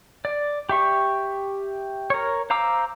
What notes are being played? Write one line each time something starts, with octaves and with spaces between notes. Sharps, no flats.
D5
G4 E5 C#6
A#4 C#5
C5 F5 A#5 D6 E6